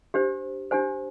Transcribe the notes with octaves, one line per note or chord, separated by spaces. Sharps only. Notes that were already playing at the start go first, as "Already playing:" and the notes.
D4 G4 C5
D4 G4 C5 G#5